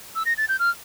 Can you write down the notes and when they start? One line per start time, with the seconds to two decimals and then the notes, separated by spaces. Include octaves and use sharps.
0.15 E6
0.26 A#6
0.38 A6
0.49 G6
0.59 F6